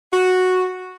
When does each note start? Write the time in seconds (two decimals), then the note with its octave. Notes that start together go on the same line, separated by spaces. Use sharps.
0.12 F#4